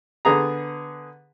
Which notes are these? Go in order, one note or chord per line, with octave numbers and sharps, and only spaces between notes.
D3 B3 G#4 A#5